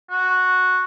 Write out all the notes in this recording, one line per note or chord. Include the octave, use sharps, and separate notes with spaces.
F#4